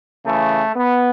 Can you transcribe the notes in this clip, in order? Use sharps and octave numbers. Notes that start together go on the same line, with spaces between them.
C#3 E3 A3
B3